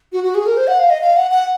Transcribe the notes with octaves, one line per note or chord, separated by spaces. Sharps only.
F#4
F#4
G#4
A#4
C5
F#5
F5
D#5
F5
F#5
F#5